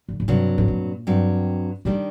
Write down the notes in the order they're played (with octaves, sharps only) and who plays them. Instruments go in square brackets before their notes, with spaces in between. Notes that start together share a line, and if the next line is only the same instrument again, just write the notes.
[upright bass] D3
A#2
[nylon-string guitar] G2 F#3 C4 [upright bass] C3
[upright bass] A2
A#2
[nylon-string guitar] G2 F#3 C4
[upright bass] A#2 [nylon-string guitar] D#3 G3 D4